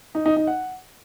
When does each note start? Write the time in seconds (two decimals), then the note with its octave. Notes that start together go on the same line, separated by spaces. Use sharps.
0.15 D#4
0.26 D#4
0.36 D#4
0.47 F#5